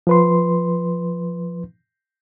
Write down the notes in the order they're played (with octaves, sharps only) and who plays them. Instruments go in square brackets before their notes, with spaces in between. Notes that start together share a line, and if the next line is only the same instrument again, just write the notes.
[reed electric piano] F3 B4 C6